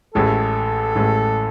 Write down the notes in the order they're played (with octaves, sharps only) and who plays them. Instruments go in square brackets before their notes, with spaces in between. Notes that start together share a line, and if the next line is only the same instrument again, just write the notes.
[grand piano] A1 A2 G#3 [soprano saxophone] A4
[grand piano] A1 A2 G#3